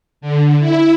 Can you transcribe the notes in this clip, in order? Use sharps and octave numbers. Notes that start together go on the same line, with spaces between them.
D3
E4